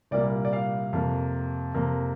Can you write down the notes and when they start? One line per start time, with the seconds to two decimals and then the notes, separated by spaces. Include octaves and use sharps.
0.11 C2 A#2 G3 A#3 D5
0.45 D5
0.53 F5
0.93 F2 C3 A#3
1.75 F2 C3 A#3